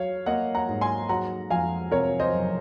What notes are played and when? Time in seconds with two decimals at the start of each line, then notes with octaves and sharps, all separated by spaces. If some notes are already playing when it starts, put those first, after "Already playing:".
Already playing: F#3 C#5 F5
0.26 A#3 D#5 F#5
0.55 F#5 A#5
0.69 G#2
0.81 G#5 C6
1.09 F#3 F#5 A#5
1.50 F2 F5 G#5
1.91 C3 A#4 C#5
2.20 C5 D#5
2.33 F#1